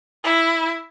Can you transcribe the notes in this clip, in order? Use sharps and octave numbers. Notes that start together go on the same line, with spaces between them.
E4